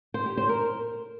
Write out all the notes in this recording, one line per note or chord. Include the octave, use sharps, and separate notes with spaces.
C5
G4
C5
A#4